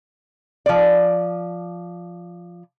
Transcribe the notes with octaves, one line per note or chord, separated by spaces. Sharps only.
F3 D5